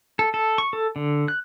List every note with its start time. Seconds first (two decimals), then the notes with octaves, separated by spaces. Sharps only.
0.19 A4
0.34 A4
0.58 C#6
0.73 A4
0.96 D3
1.28 F#6